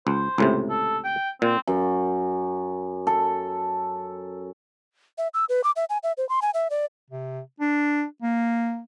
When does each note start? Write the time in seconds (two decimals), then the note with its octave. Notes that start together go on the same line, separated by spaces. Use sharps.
0.07 C#2 C5
0.38 C#2 A2 C3
0.70 A4
1.04 G5
1.42 A#2 C4
1.67 F#2
3.07 A4
5.18 E5
5.34 E6
5.49 B4
5.64 D6
5.76 E5
5.90 G#5
6.03 E5
6.17 C5
6.29 C6
6.42 G#5
6.54 E5
6.70 D5
7.10 C3
7.60 D4
8.22 A#3